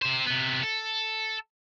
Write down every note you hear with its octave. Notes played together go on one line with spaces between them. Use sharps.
C3 C5
C3 B3
A4